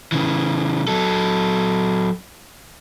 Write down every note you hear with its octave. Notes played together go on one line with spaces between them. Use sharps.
C#3 E3
F#3 A4